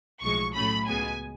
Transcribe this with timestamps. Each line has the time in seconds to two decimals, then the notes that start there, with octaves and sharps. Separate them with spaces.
0.22 B1 A2 F3 G#3 C#6
0.55 A2 F#3 A3 C#4 B5
0.88 C#2 B2 G#3 B3 G#5